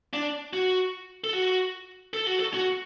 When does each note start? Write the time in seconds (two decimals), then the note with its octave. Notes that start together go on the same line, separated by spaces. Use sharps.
0.13 D4
0.53 F#4
1.24 A4
1.33 F#4
2.13 A4
2.26 F#4
2.40 A4
2.54 F#4